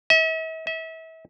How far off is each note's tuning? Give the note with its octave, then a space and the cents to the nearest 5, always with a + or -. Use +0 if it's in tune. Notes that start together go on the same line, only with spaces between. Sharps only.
E5 -45
E5 -35